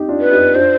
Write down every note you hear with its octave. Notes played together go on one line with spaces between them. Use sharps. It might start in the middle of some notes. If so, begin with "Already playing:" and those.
Already playing: D#4 G4
D4 F4
B4
D#4 G4
D4 F4 C5